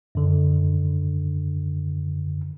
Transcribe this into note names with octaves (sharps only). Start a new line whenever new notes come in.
F#2 D3